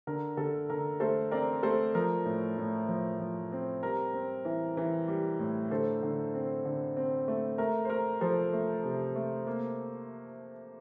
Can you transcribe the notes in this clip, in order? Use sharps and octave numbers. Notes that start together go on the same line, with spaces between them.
D3 A#4
D3 A4
D3 A#4
A3 A4 C5
C4 A#4 D5
A3 A4 C5
F3 A#4
A2
A2
F3
F3
C4
G3 A#4
C4
E3
E3
G3
A2
D3 A4 C5
D3
C4
D3
C4
A3
A3 A#4
C5
A3 A#4
F3 A4 C5
A3
C3
A3
A#3